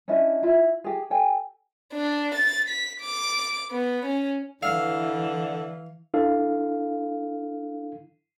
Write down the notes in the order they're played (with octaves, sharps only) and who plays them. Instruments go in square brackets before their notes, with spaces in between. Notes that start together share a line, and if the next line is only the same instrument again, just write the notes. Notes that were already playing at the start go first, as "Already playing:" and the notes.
[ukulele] C#4 D4 E4 D#5
E4 F4
G4 G#4
G4 A4 G5 G#5
[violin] D4
A6
B6
D6
B3
C#4
[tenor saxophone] D3 [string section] E3 [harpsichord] F5 [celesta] E6 F6 C7
[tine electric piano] D4 E4 A4 F5